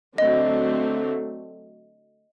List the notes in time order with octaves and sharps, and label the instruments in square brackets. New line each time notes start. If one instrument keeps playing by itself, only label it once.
[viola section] D3 F#3 A3 C4 [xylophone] D#5